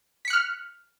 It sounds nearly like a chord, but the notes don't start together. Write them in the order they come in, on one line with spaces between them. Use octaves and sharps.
B6 C#7 F#6 F6